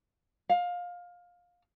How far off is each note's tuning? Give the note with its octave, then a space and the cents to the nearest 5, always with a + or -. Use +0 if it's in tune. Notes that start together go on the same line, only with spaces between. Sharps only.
F5 +20